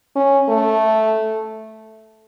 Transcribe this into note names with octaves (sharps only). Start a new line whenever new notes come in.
C#4
A3